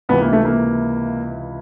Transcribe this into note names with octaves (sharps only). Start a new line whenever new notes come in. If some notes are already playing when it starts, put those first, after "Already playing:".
C#2 C3 E3 B3
A#3
A3
A#3